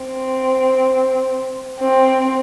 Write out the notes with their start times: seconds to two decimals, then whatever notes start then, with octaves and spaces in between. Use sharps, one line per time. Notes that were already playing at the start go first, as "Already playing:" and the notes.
Already playing: C4
1.80 C4